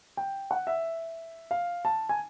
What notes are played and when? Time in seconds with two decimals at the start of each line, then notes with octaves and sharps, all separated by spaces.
0.17 G5
0.51 F#5
0.67 E5
1.51 F5
1.85 A5
2.09 G#5